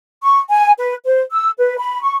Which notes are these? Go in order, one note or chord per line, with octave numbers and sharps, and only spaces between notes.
C#6
G#5
B4
C5
E6
B4
B5
C#6